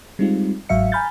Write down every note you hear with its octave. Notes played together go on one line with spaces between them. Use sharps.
G3 G#3 C4 D#4 F4
G1 G#2 F#3 E5 F5 C#7
G#5 A#5 B5 F6 G6 A6